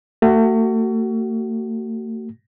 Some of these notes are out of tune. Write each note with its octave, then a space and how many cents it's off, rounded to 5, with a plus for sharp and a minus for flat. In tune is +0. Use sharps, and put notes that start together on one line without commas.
A3 +40 F#4 +30